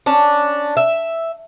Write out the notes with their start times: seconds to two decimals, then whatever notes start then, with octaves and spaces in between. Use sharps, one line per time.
0.06 C#4 D4
0.77 E5